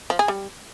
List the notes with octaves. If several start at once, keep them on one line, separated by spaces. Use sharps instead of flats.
F3
G#4
G3